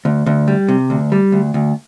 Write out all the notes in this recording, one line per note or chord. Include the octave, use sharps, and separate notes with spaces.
D2
D2
G3
C3
D2
G3
D2
D2